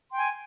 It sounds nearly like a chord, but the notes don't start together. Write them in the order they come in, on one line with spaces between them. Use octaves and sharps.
C6 G5 G#5